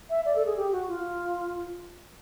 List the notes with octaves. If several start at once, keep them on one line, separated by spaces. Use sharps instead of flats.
E5
D5
A4
G#4
G4
F#4
F4